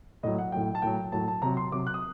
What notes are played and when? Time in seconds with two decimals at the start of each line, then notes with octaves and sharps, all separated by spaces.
0.23 A2 F#3 D#5
0.38 F#5
0.52 A2 F#3 G5
0.75 A5
0.82 A2 F#3 G5
1.12 A2 F#3 A5
1.28 A5
1.42 C3 F#3 A#5
1.57 C6
1.72 C3 F#3 D6
1.87 F#6
1.94 D#6